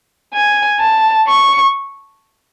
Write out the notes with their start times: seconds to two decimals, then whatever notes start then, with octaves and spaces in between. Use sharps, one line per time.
0.33 G#5
0.80 A5
1.28 C#6